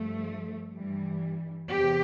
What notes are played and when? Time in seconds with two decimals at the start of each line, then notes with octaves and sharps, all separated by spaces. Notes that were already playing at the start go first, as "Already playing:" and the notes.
Already playing: G2 F3 A3
0.75 G2 E3 G3
1.71 E2 C3 G4